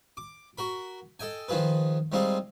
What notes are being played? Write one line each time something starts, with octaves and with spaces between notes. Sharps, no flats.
D6
F#4 A#4 B5
A4 D#5 G5 G#5
D#3 F3 F4 G#4 B4
G3 G#3 C4 D#4 F4 G#4